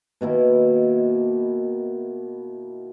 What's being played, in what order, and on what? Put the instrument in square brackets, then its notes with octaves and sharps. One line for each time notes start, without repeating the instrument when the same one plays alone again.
[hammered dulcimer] B2 D#3 A#3 E4